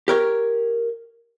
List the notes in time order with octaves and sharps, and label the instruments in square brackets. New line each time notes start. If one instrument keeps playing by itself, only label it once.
[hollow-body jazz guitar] G4 A#4 C#5